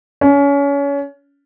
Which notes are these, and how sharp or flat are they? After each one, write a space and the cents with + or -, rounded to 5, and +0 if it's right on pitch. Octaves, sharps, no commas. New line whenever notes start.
C#4 +30